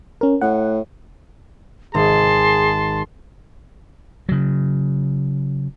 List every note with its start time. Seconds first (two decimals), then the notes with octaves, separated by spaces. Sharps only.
0.21 C#4 A#4
0.41 A2 F#5
1.94 G#1 G#4 A5 C6
4.29 C#3 F#3